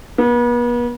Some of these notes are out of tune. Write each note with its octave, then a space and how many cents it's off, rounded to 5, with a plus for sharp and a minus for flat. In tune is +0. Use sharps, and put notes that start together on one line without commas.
B3 -40